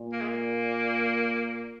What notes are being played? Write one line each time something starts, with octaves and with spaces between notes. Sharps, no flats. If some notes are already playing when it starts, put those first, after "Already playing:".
Already playing: A#2
A#3
G#3
A#3